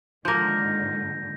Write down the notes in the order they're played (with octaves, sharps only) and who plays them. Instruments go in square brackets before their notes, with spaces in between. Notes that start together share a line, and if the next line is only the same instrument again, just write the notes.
[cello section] G#2 D3 D#3 [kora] F3 A#3 [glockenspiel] G6 A#6